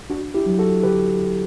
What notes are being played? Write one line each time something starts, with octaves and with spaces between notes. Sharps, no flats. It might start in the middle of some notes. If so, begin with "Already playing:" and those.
D2 D4 F#4
E4 G4
F#3
F#4 A4
D3 G4 B4
D2